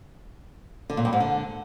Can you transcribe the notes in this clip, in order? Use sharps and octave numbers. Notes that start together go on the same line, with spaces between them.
D3
A#2
G2
G#2
D3